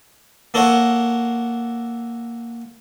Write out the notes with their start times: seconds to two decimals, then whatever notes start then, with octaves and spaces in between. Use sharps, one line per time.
0.54 A#3 A4 A#4 C#5 F5 F#5